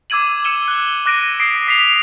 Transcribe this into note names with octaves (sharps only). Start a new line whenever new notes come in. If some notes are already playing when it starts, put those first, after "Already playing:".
D6 E6 G#6 D#7 F#7
E6 C#7 D#7 E7 G7
F#6 G7
D6 F#6 A#6 D7 D#7
D#6 B6 C7 D7
D#6 B6 C7 F7